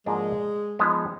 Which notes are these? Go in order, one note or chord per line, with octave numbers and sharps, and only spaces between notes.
G#2 F3 G#3 A#3 D4 F#4
F3 G#3 B3 D#4